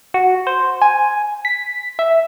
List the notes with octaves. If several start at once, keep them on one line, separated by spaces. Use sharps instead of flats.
F#4
C5
G#5
B6
E5